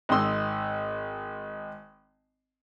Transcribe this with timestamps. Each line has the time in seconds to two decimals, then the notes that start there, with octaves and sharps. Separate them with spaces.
0.09 G#1 D#4 D#5 C6 E6